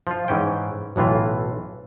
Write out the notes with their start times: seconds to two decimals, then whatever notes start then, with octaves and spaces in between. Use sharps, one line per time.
0.07 F3 F4
0.28 G#2 E3 C#4 G5
0.96 B1 A2 E3 F4